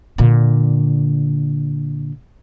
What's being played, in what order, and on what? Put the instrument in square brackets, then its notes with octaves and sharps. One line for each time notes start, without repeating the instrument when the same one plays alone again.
[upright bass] A#2 D3